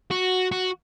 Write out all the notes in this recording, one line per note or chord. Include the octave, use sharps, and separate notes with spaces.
F#4
F#4